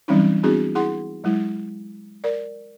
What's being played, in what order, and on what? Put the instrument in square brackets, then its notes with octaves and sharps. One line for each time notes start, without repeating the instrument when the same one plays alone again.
[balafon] E3 F#3 G3 C4 C#4 D#4
B3 C4 D4 E4 F#4 G#4
E4 G#4 F#5 C6
F#3 G#3 E4
A#4 D5